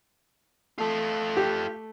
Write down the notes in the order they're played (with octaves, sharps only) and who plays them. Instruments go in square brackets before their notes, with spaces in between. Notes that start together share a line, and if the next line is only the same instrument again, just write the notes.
[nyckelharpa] A3 [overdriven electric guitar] F4 A4
[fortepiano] G4